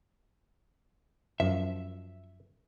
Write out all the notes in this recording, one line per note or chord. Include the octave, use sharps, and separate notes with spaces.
F#2 F3 E5